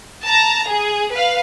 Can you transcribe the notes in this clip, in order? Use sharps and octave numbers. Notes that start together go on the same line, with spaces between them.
A5 A#5
G#4
B4 F5